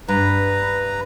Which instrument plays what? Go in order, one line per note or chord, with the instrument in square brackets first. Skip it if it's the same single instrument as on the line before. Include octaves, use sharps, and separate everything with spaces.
[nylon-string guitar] G2 [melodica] B4 A#5